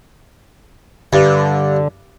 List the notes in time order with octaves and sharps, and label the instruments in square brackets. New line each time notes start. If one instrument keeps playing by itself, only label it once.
[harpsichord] G2 [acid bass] D3